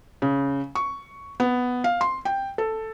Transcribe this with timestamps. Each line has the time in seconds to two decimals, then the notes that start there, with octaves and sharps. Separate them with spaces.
0.22 C#3
0.75 C#6
1.40 B3
1.84 F5
2.01 C6
2.25 G5
2.58 A4